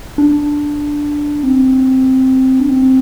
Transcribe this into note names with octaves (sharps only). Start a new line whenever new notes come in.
D4
C4
D4
C4